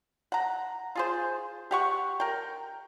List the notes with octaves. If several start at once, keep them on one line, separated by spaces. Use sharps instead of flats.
F#5 A#5
F4 G#4 C5
G4 F#5 C#6
A#4 G5